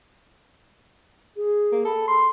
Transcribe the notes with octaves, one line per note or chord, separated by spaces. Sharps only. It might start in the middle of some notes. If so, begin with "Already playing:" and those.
G#4
A#3
A4 B5
C6